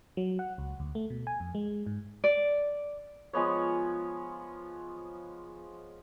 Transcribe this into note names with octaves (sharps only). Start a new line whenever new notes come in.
F#3
F#5
C#2
D2
A3
B2
G#5
F2
G#3
G#2
D5
F3 G#3 B3 C#5